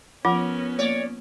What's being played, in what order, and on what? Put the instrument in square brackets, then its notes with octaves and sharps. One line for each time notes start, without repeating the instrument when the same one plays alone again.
[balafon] F3 F#5 D6 [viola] B3 C#4 [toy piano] F4 [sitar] A#4
[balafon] A#3 [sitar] C#5 D5